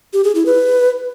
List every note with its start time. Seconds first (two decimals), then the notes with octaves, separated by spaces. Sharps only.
0.13 G4
0.24 G#4
0.35 E4
0.46 B4